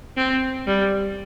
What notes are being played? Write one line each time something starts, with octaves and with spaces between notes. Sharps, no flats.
C4
G3